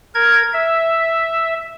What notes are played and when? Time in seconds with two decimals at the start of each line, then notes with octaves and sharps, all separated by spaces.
0.15 A#4 G#6
0.53 E5